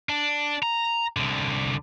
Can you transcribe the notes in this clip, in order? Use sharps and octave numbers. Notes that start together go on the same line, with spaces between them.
D4
A#5
C2 D3